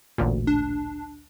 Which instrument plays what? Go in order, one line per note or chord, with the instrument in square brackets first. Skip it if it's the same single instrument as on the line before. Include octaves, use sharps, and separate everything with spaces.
[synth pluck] A1 D2 A#2
[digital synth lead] D4